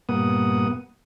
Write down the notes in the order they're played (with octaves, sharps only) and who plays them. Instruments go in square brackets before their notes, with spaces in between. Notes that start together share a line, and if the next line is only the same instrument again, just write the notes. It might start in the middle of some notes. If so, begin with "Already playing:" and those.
[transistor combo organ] G2 A#2 A#3 B3 F#5 D#6